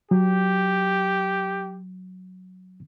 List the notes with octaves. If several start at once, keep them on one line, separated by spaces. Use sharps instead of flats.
F#3 G4